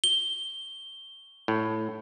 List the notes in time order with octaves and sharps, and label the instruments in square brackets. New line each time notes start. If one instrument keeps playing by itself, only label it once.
[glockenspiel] G7
[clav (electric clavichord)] A2